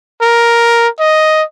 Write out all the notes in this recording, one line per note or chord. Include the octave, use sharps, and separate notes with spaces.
A#4
D#5